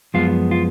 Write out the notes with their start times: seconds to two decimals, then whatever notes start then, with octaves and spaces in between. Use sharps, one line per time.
0.14 F#2 F3 G#3 B3 F4
0.51 F4